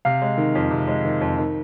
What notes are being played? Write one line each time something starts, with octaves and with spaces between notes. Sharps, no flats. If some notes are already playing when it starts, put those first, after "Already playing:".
C3 F5
G#3
D#3
F2
C3
G#3
D#3
F2
D#3